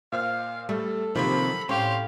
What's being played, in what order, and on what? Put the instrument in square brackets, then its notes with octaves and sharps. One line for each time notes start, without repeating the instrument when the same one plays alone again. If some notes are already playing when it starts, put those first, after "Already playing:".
[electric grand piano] A#2 C5 F6 [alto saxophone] F5
[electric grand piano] G3 [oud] A3 [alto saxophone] A4
[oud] C3 F#3 A#3 [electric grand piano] D#3 F3 C4 [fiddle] B5
[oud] A2 C#4 [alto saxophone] C4 [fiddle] G4 F5 [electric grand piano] C6 C#6